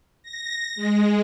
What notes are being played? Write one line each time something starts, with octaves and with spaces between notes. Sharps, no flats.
A#6
G#3